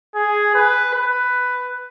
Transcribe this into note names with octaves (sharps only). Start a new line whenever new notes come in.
G#4
B4
B4